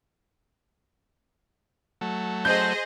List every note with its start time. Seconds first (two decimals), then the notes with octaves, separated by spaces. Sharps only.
2.01 F#3 A3
2.45 G#4 C5 D#5 G6